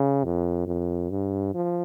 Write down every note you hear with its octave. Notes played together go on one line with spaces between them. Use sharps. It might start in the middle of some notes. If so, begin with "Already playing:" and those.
Already playing: C#3
F2
F2
G2
F3